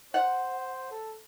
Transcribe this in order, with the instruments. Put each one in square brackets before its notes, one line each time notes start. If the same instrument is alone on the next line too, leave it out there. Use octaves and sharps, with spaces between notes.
[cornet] C5 [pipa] F#5
[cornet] A4